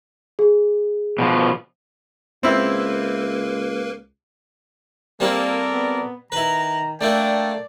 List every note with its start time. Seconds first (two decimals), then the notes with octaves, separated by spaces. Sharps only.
0.39 G#4
1.19 B2 E3 F3
2.43 C#2 A#3 C4 E4 A#4 B4
5.20 G3 A#3 C4 E4 A4 A#4 D5
5.72 B3
6.32 D#3 E4 B4 A#5
7.01 A3 A#3 D4 E4 A4 D5 G5